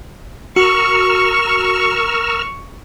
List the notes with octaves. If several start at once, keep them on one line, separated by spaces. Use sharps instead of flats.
F#4 A#4 C#6 E6 F6 C#7